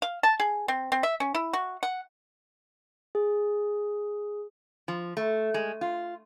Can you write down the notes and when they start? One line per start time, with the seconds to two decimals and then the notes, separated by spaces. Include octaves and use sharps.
0.02 F5
0.23 A5
0.40 G#4
0.68 C4
0.92 C4
1.03 E5
1.20 C#4
1.35 E4
1.53 F#4
1.83 F#5
3.15 G#4
4.88 F3
5.17 A3
5.54 G#3
5.81 F4